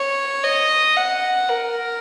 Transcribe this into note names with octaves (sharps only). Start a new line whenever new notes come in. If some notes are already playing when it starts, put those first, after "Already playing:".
Already playing: C#5
D#5
F#5
A#4